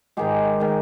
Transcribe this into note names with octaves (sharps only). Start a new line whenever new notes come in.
G#2 D#3 G#3 G4
D#3 G#3